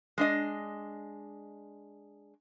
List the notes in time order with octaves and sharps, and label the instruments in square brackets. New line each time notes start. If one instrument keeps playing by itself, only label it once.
[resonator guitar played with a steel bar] G#3 D4 D#5